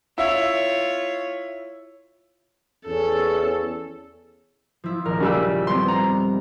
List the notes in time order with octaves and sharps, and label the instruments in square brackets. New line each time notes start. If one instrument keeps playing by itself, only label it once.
[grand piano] E4 E5 [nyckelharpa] F4 C#5
[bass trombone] E2 [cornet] C#4 [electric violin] A4
[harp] F3 E4
[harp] D#1 [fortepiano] A#4
[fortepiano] C#3 G3 E6
[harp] G3 B3 C4 [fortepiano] C6
[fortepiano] A#5